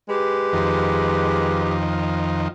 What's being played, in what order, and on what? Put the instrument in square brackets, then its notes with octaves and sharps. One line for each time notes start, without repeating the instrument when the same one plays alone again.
[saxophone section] G#3 G4 B4
[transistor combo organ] F2 D#3